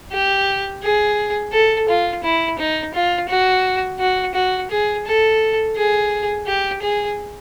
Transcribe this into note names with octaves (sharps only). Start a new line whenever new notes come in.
G4
G#4
A4
F4
E4
D#4
F4
F#4
F#4
F#4
G#4
A4
G#4
G4
G#4